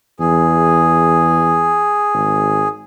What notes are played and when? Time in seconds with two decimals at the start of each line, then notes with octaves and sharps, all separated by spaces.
0.20 E2 G#4
2.14 G#1